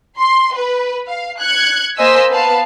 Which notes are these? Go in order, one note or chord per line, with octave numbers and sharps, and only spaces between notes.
C6
B4
F5
F#6 G#6 C#7
A#3 C5 D#5 G#5 E6 B6
B3 B4 F5 A5